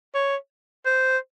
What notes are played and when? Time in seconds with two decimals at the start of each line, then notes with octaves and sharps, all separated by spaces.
0.14 C#5
0.85 C5